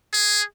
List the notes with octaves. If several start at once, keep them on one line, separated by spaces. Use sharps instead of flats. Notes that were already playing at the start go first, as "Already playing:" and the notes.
G#4